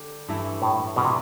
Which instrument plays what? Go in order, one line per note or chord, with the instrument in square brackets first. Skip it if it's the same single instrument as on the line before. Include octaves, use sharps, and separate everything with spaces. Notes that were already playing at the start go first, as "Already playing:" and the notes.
Already playing: [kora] D3 G3 D4 G4
G2 E3 A3 E4
[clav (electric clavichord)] A2
[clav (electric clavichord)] B2 [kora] E3 G3 B3
[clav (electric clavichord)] C3